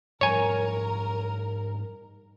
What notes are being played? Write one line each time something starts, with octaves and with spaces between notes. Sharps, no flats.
G#2 F3 G3 A#4 C#5 G#5